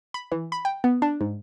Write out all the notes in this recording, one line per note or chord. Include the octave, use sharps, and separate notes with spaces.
B5
E3
B5
G5
B3
D4
G#2